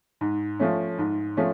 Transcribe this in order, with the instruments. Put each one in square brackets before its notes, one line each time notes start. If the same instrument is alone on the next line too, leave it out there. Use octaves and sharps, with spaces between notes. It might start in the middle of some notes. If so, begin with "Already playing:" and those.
[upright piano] G#2
F3 A3 C#4
G#2
F3 A3 C#4